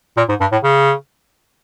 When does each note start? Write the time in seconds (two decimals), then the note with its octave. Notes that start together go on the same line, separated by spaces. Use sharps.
0.17 A#2
0.29 G#2
0.40 G2
0.52 A2
0.64 C#3